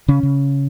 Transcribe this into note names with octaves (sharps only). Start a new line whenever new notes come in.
C#3 C#4
C#3